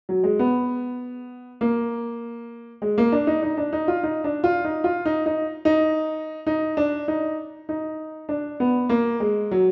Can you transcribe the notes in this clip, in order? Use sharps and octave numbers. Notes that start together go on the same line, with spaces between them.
F#3
G#3
B3
A#3
G#3
A#3
D4
D#4
D#4
D4
D#4
F4
D#4
D4
F4
D#4
F4
D#4
D#4
D#4
D#4
D4
D#4
D#4
D4
B3
A#3
G#3
F#3